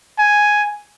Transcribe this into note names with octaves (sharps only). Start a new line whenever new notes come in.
G#5